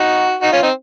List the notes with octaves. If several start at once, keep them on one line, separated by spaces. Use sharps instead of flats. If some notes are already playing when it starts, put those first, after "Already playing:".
Already playing: D#4 F#4
D#4 F#4
C#4 F4
C4 D#4